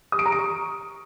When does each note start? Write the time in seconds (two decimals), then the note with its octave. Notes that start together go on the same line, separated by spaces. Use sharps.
0.12 D#6
0.19 D7
0.26 A#5
0.32 D7
0.39 C#6